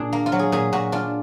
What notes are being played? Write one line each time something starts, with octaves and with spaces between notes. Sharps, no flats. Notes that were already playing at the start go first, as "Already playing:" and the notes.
Already playing: A#2 D4 G#4
A#3
F4
F#3
G#4
A#2 G#4
A#2 F#4
D4 F4